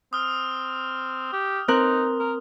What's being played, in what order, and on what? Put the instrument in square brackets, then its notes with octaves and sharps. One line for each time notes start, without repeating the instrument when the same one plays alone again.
[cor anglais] C4 [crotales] D#6 F6
[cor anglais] G4
[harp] C4 A#4 F#6 [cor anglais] D#4
[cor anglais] A#4